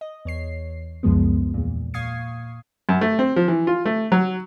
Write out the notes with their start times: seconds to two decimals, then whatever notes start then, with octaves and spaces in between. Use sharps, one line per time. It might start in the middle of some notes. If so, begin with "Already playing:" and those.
0.01 D#5
0.25 E2 C#5 C7
1.03 C#2 F#2 F3 G#3 B3
1.54 E2 A#2
1.94 A#2 F5 C#6 D#6 G#6 C7
2.89 F#2
3.01 A3
3.19 C4
3.36 F3
3.48 E3
3.67 F4
3.86 A3
4.12 F#3